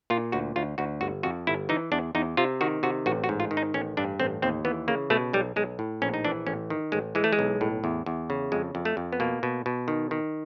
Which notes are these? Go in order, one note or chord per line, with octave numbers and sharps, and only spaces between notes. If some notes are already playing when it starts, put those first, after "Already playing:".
A#2 F4
D2 F#4
D2 F4
D2 F#4
G1 F#4
F2 F#4
G1 E4
E3 D#4
E2 D4
E2 D#4
C3 F4
D#3 F#4
C3 F#4
A1 F#4
F#4
G#2
F4
D#3
D#4
A1 C#4
G2 D4
A1 C4
D#2 C4
E3 B3
C#3 A#3
B2 A3
B1 G3
B1 G#3
A2
A#1 C#4
D#4
E3 D4
A1 C#4
D#3
A1 G#3
E3 G#3
A3
G#3
B1
A2
E2
E2
C#3
F2 G#3
F2
A3
F2
B3
B2 A#3
B2
B2
D#3
D#3